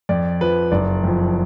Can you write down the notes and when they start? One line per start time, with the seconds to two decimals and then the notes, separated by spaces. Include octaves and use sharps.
0.09 F2 D5
0.41 F3 B4
0.72 F#1 D5
1.04 F2 F3